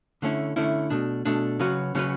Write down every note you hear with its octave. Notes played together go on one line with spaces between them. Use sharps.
D3 A3 C#4 E4
D3 A3 C#4 E4
B2 A3 D4
B2 A3 D4
C#3 F#3 C#4 F#4 B4
C#3 F#3 C#4 F#4 B4